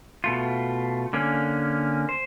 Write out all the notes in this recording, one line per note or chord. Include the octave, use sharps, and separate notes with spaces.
B2 A3 F4
D3 A#3 C#4
C5